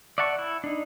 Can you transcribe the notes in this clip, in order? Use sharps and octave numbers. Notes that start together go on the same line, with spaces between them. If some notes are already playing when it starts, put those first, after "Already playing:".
D5 E5 F#5 A5 C#6
E4
D4 D#4